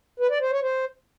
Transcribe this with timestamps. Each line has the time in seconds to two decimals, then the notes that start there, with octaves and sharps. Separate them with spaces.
0.20 B4
0.30 D5
0.41 C5
0.51 C#5
0.62 C5